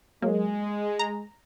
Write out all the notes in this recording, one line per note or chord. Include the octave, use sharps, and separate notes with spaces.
F#3 G#3 A#3
A#5